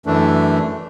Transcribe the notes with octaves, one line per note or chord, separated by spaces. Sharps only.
F#2 E3 A3 D4